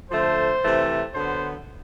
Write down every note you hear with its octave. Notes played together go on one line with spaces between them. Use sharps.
D3 F3 A3 C5
C3 E3 A3
D3 F#3 B3 C5